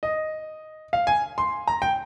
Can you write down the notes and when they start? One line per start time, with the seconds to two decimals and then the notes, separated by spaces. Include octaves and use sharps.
0.03 D#5
0.93 F5
1.07 G#5
1.38 C6
1.67 A#5
1.82 G5